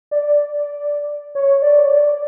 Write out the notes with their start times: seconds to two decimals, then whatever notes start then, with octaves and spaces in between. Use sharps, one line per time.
0.11 D5
1.35 C#5
1.62 D5
1.78 C#5
1.88 D5